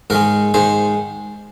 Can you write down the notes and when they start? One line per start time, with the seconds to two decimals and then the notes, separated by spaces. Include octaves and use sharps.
0.10 G#2 D#3 G#3 A#4
0.54 G#2 D#3 G#3 C5